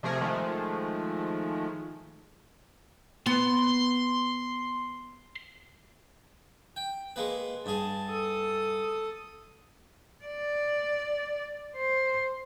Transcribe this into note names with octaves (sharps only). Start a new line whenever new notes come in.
C3 F3 A3 G#4 A#4
D#3 F3 G#3 A3
B3 C6
G5
G#3 A#3 B4
G2 G#4 A5
A4 D#6
D5
C5